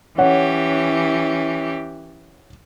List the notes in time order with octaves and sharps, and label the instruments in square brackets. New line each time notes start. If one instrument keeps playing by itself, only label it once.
[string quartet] E3 C#4 G4 [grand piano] C#5 F#5